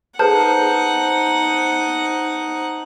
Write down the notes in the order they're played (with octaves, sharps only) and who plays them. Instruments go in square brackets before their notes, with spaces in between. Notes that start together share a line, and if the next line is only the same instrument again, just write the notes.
[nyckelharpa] D#4 F#5 [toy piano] G#4 A4 B4 [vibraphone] C5 [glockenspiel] A5 G6